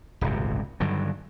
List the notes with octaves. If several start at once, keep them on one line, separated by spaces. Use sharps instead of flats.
D#1 G#1 C#2 C3
G2 D3 D#3 F#3